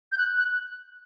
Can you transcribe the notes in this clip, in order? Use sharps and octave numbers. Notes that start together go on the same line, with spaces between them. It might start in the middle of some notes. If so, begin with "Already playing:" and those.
G6
F#6
F#6